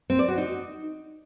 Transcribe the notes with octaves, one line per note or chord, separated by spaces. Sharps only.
C4
D5
F#4
D#4